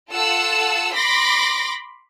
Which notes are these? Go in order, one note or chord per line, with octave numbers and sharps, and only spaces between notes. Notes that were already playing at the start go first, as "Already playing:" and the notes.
F4 A4 F#5 A5 E6
B5 C6 D6 A#6 B6